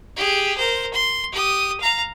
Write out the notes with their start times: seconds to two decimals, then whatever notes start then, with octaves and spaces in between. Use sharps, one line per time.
0.17 G4 G#4
0.57 A#4 C5
0.94 C6
1.33 G4 D#6
1.81 F5 A#5